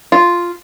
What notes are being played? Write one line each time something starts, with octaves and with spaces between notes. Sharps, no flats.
F4